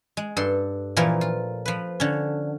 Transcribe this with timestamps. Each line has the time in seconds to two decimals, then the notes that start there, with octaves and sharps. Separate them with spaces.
0.17 G#3
0.37 G2 A4 C6
0.97 A#2 E3 F3 A3 F4 A#4
1.21 F4
1.66 F3 B4
2.00 D3 C#4